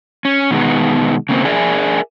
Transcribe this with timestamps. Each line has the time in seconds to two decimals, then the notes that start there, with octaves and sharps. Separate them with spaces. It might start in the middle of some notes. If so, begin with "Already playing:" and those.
0.25 C#4
0.51 B2 D#3 G#3 B3
1.29 C#3 A#3 C4
1.45 G#4 A#4 D5 E5 G#5